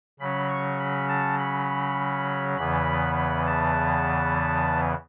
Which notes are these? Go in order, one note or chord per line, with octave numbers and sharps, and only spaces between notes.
C#3 F#3 C#4 B5
C#6
B5
A5
B5
E2 C#3 E3 B3 B5
B5
A5